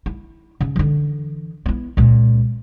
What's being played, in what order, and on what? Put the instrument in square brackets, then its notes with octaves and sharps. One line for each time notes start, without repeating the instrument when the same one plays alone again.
[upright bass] E4
C#3
D3 E3
B3 E4
C#2 A#2